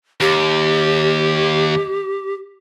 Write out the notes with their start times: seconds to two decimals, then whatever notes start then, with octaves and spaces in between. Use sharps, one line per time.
0.20 D#2 G4